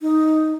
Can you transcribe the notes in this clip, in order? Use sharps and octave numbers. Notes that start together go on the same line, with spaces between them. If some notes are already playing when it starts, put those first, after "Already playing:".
D#4